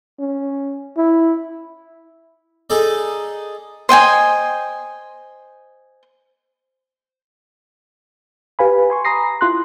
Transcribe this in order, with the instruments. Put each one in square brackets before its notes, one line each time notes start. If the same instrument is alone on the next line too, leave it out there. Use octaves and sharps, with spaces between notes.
[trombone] C#4
E4
[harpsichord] D#4 G#4 A4 D5
[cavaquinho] C5 D#5 G5 G#5
[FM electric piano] G4 B4 F5 G#5 B5
G#5 C6 C#6
A#5 B5 D#6 A#6 C7
E4 F4 C6 F#6